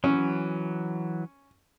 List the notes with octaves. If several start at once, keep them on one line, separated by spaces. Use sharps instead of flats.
E3 F#3 C#4